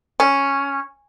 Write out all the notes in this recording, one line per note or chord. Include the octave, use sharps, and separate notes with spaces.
C#4